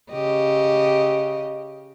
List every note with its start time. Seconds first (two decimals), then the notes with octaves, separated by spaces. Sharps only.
0.11 C#3 G4 D#5